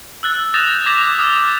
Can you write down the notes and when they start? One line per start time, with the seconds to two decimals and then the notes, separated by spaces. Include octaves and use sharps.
0.23 E6 F#6 A6
0.54 D#6 G6 A6 A#6 E7 F7
0.86 D6 G#6 A#6 B6 F7
1.19 D#6 F6 A6 F7